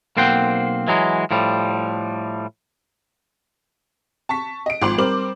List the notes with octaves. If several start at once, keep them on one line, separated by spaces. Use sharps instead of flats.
B1 A#3 C4 C5 F#5 G5
E3 F#3 G#3
A2 F3 G3
A5 C#6 B6
D#5 D7
G#1 F3 C6 D6 D7 F#7
G3 C4 A#4 C5 D6 F#7